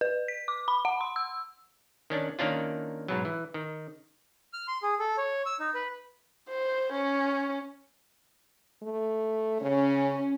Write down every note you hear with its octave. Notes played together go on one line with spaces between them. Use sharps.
B4
B6
D6
B5
F#5
C6
E6
D#3 C#4 D4
D#3 A#3 C#4 D4 F4
G#2 B2 F#3
E3
D#3
F6
C6
G#4
A4
C#5
E6
D#4
B4
C5
C#4
A3
C#3 C#4